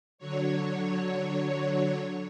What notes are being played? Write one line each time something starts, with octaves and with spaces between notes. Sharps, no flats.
D3 F#3 C#5